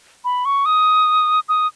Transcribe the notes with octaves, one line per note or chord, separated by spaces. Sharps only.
B5
C#6
D#6
D#6